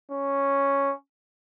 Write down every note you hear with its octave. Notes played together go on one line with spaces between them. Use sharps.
C#4